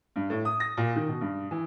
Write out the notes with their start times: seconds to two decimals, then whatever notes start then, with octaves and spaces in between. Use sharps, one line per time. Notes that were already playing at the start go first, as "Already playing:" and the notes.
0.16 G2
0.30 A2
0.45 D#6
0.60 A#6
0.77 A#2
0.96 D#3
1.08 B2
1.21 G2
1.51 E3